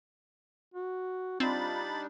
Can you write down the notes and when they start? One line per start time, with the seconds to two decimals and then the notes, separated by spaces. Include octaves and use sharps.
0.74 F#4
1.40 G3 C4 D4 D#4 F4 B5 A6